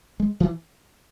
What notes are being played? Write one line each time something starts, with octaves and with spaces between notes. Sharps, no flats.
G#3
E3